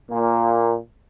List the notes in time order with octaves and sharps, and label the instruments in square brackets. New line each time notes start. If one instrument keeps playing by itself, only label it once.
[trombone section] A#2 A#3